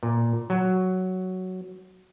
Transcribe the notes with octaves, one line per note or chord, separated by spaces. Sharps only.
A#2
F#3